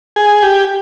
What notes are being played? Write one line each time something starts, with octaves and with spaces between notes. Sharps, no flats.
G#4
G4